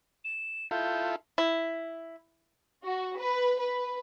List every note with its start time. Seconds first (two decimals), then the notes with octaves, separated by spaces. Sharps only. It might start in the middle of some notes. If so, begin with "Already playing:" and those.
0.24 E7
0.71 E4 F4 A4 G6
1.38 E4
2.84 F#4
3.17 B4
3.60 B4